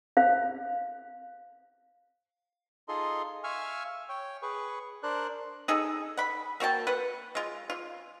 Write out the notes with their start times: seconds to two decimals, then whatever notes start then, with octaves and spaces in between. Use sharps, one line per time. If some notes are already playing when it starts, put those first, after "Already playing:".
0.17 C5 F5
2.88 D#4 F4 G#4 A4 D#5 C6
3.44 E5 F5 G#5 C#6 E6 F6
4.09 C#5 G5
4.42 G#4 B4 C#6
5.03 D4 A#4 C5 D5 F#6
5.68 D#4 G#4 A4
6.17 F#5 B5
6.60 A#3 F#4 G5 A5
6.87 B4 F#5
7.35 G#3 F4
7.70 F4